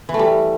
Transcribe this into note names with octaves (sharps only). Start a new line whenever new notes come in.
E3
A3
G3